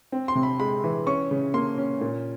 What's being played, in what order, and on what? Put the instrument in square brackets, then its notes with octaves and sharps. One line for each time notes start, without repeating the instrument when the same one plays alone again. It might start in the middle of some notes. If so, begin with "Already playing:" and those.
[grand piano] C4
C6
C3
B5
G#3 B5
E3
C#4 C#6
C#3
A#3 C6
C#4
A#2